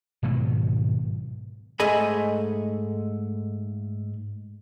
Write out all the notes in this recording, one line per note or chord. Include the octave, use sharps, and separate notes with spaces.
G#2 B2 D#3 F#3
G#2 A3 G#4 D#5 G#5 B5